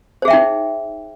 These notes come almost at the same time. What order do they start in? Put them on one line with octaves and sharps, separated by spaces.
C5 G#4 E5 G5 D#4